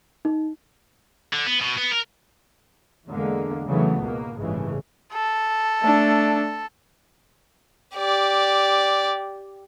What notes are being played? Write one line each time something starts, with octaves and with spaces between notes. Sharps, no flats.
D#4
D3
B3
B2
B3
A#4
E2 D3 G#3 A#3
C#3 E3 F#3 A3 B3
C#2 G#2 B2 A#3
G1 C2 A2 C#3 E3 G#3
A4
A3 D4
G4 D5